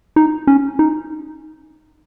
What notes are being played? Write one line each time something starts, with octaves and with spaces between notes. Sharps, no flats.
D#4
C#4
D#4